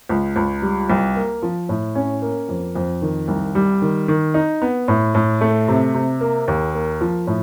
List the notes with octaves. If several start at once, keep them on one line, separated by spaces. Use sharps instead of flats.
C#2
C#2
G3
C2
A#3
F3
A2
C#4
A#3
F2
F2
D#3
C2
G3
D#3
D#3
D#4
B3
A2
A2
A3
C3
C3
A#3
D#2
A#3
F3
A2